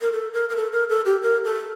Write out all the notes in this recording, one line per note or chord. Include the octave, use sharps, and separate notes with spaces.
A#4
A4
A#4
A#4
A4
A#4
A4
G4
A#4
A4